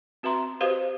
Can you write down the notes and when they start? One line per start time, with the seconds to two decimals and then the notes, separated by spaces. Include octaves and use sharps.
0.23 C4 F#4 B4 E5 A#5 C6
0.61 F#4 G4 B4 C5 D#5 F5